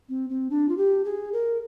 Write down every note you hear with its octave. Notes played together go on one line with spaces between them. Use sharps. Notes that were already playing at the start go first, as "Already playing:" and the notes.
C4
C4
D4
F4
G4
G#4
A#4